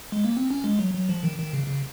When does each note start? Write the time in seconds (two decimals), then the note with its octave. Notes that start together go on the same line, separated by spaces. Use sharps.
0.12 G#3
0.25 A#3
0.37 C4
0.50 C#4
0.64 G#3
0.79 F#3
0.94 F#3
1.09 F3
1.23 D#3
1.38 D#3
1.53 C#3
1.67 C#3